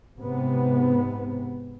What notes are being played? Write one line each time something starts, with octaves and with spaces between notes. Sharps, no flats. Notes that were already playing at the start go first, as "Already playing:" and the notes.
G#2 C3 B3